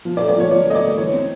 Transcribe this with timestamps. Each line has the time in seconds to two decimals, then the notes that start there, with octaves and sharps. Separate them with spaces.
0.05 F3
0.17 D5
0.21 A3
0.28 D5
0.36 F3 C#5
0.51 F3 D5
0.67 A3 D#5
0.75 D5
0.82 A3
0.98 E3 C#5
1.13 C4